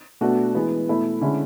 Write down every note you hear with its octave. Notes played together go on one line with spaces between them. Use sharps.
B2 A3 D4 F#4
E3 G#3 B3 E4
B2 A3 E4
D3 G#3 C#4 E4